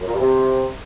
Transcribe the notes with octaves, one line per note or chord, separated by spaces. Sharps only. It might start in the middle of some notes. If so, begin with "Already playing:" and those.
F#2
A#2
G2
C3